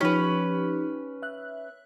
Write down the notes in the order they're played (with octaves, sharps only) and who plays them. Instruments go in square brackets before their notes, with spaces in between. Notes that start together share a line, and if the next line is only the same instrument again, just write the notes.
[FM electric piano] F3 D#4 G4 [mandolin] C#4 B4
[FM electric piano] E5 F#6